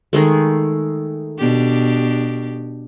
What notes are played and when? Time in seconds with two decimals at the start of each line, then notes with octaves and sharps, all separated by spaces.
0.13 D#3 G#3 A3
1.38 B2 D4 G4